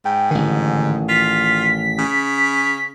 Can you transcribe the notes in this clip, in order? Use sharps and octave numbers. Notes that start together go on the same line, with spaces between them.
G#2 G5
A1 D3 D#3
F4 B6
C#3